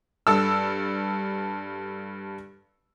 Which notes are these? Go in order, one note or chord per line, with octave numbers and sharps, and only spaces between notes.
G2 A4 E6